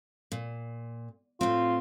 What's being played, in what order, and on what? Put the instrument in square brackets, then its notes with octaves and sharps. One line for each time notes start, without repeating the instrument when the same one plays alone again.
[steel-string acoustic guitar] A#2
[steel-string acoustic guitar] A2 C4 [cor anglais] F4